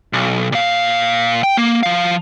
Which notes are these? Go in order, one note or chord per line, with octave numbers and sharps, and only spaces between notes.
B1
A#2 F5
G5
A#3
F3 F5